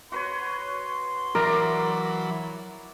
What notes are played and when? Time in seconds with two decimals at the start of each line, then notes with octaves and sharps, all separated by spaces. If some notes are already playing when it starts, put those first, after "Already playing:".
0.12 F#4 B4 C#5 C6
1.35 E3 F#3 A#4 D5 E5 A#5 B5